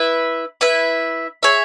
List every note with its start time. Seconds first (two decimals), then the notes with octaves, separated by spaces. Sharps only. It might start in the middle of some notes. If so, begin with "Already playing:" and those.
Already playing: E4 B4 E5
0.61 E4 B4 E5
1.43 G#4 C#5 E5